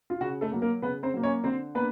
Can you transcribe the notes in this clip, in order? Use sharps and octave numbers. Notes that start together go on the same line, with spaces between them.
F4
C#3 F#4
A3 A4
F#3 A#3
A#3 A#4
C#3 B3 B4
C4 C5
F#3 A#3
C#4 C#5
D3 C4 C5
A#3 B3 D4 B4